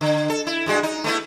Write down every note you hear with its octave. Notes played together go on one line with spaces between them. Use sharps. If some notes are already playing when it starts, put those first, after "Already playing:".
D3
A4
E4
G2 G#3 F#4
D#4
A3 B3 E4